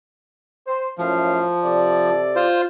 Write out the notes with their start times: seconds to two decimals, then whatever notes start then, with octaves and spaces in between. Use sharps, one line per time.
0.67 C5
0.98 F#2 A2 F3 F5
1.63 C3 A4 D5
2.36 F4 C5